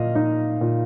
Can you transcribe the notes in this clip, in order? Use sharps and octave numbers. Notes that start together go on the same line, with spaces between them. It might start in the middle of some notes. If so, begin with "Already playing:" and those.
Already playing: A#2 D#5 F5
D#4
A#2